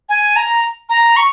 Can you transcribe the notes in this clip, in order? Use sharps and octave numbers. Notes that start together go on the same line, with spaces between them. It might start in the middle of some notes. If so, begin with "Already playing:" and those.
G#5
A#5
A#5
C#6